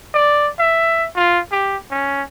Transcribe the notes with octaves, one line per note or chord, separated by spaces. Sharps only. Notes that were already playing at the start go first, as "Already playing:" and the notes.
D5
E5
F4
G4
C#4